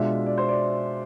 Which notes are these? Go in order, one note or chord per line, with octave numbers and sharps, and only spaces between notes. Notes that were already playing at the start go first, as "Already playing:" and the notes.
Already playing: B2 G#3 D4 F4 E5
D5
C5
D5